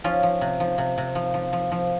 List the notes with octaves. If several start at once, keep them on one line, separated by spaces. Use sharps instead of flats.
F3 C#4 F4
F3
C3
F3
C3
C3
F3
F3
F3
F3